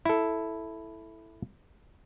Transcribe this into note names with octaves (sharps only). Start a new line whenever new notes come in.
E4 A4